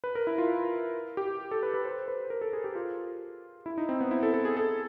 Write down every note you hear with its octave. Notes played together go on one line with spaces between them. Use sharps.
B4
A#4
E4
F4
G4
A4
B4
B4
C5
B4
A#4
A4
G#4
G4
F4
E4
D#4
C4
B3
E4
A4
A4
G#4
A4